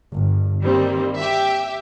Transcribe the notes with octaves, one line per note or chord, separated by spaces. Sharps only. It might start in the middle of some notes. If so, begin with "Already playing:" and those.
G1
D#3 G3 A#3 C4
G4 E5